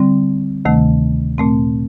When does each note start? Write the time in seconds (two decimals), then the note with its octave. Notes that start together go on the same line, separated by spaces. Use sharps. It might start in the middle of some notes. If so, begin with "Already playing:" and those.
Already playing: D3 G3 C4
0.65 D2 C3 D#3 A3
1.38 A#2 A3 C4